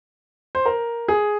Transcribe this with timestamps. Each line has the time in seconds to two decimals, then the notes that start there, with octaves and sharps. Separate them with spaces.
0.55 C5
0.66 A#4
1.08 G#4